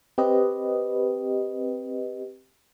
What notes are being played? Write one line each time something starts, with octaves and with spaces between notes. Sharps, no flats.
C4 G4 B4 D#5